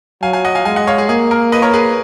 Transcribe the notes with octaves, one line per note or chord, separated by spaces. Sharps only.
F#3 F5 G#5
F5 G#5
D#5 F#5
F5 G#5
G#3 F5 G#5
D#5 F#5
C#5 F5
G#4
A#3 G#4
A#4
B4 D#5
A#4 C#5
G#4 B4